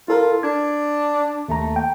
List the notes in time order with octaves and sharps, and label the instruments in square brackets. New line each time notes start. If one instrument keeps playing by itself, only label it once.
[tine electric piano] E4 A4 A#4 [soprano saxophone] F4
[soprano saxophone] D4 [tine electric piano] G#6
[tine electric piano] D#2 A#5 [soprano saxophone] A3
[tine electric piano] G5